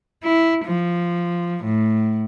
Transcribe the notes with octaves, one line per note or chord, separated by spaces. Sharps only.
E4
F3
A2